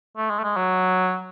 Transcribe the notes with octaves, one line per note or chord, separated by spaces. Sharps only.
A3
G#3
A3
G#3
F#3